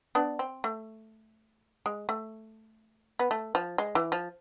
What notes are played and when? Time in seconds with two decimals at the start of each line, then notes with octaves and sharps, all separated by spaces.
0.15 B3 D4
0.39 C4
0.64 A3
1.86 G#3
2.09 A3
3.19 B3
3.31 A3
3.55 F3
3.78 G#3
3.95 E3
4.12 F3